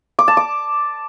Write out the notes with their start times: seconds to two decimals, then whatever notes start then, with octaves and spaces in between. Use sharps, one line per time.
0.19 D6
0.28 A5
0.37 D6